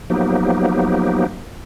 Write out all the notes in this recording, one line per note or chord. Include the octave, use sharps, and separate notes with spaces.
F3 F#3 A#3 B3 D#4 G4